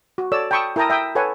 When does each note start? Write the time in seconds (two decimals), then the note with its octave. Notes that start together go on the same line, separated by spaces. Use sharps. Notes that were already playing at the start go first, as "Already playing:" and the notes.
0.18 F#4
0.32 A4 C#5 D5 E6
0.51 G5 A5 B5 C#6 D#6 E6
0.76 E4 A#4 G5 A5 A#5 D#6
0.90 E5 G5 D#6
1.15 A4 B4 C#5 F#5 G#5 C#6